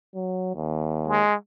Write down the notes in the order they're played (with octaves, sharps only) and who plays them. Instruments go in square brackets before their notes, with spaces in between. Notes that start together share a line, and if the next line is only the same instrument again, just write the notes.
[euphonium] F#3
D#2
[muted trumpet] G#3